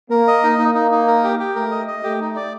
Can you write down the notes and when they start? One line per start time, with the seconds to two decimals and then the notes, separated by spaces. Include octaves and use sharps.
0.10 A#3 A#4
0.28 D#5
0.44 D#4
0.59 A#3 D#4
0.75 D#4
0.91 D#4
1.07 A#4
1.24 G4
1.39 G4
1.56 A3 A#4
1.71 D#5
1.88 D#5
2.03 A3 G4
2.21 D#4
2.36 D5